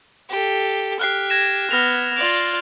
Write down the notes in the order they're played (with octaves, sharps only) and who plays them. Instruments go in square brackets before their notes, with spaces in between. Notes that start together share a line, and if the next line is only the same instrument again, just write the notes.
[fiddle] G4 A4
[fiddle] G4 [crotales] F6 F#6 C7
[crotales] G#6 A#6 E7
[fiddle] B3 [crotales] F6 A#6 F7
[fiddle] F4 D5 [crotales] F7